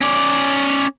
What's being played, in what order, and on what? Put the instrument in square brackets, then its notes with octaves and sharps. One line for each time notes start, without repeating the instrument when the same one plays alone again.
[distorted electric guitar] C#4 D5